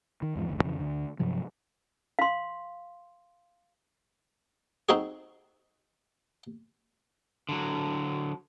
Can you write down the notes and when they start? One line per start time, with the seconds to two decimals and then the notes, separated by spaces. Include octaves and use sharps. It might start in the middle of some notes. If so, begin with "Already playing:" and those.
0.22 D#3
0.35 E2 G#2 F3
0.49 F#1 D2
0.62 F2 C#3 E3
0.79 D2 D3
1.19 G2 C3 F3 F#3
2.19 F5 C6
4.89 C4 D#4 F#4 G#4
7.49 D3 F#3